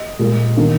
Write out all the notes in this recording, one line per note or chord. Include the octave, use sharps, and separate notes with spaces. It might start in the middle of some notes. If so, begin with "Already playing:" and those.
Already playing: D#5
A#2 G#3
D#3 A#3